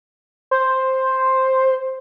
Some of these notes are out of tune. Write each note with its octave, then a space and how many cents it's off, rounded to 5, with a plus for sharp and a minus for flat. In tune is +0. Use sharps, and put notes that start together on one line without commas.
C5 +5